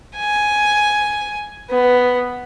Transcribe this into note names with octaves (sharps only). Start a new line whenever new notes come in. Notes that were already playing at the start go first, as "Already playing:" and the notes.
G#5
B3